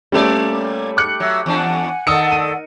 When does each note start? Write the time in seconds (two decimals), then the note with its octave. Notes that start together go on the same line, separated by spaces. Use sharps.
0.12 A#2 G3 A3 A#3 C#4 D5
0.97 D6 F#6 C#7
1.20 F#3 E5 E6
1.46 E2 D4 F#5 G#5
2.07 D#3 A4 D5 F#5 D#6 E6 C#7
2.32 D#7